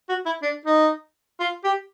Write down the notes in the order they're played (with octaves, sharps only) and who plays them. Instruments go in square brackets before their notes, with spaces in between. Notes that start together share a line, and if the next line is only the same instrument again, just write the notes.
[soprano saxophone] F#4
E4
D4
D#4
F4
G4